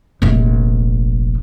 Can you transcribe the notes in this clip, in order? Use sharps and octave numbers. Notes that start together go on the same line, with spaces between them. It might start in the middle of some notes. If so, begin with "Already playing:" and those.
F1 A#1